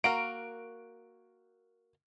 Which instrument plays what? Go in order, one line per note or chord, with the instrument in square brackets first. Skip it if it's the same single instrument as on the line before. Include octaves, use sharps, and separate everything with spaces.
[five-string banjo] A#3 F#4 A#4 [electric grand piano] D7